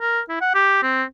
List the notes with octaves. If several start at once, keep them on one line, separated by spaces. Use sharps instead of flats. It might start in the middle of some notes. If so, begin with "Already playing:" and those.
A#4
E4
F#5
G4
C4